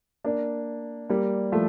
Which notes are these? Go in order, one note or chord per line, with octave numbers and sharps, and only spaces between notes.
A#3 D4
G3 A#3
F3 A3